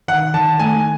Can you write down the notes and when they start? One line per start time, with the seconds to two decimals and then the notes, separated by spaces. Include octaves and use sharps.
0.08 D#3 F#5
0.34 D#3 A5
0.59 A3 G#5